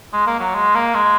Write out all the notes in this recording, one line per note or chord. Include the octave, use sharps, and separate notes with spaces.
G#3
A#3
F#3
G#3
A#3
G#3